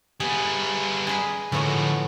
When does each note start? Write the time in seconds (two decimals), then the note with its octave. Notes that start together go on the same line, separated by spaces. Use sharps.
0.20 G3 B3 G#4
1.07 G#4 B4 D#5
1.52 A2 D3 F3 B3 F#4